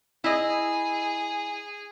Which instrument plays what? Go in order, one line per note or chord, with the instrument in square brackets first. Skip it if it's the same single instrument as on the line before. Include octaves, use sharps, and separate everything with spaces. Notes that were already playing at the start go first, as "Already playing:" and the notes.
[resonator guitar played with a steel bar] E4 D#5 [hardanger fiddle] G#4